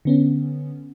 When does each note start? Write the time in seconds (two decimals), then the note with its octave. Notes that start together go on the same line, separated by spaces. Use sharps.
0.05 D3 B3 C#4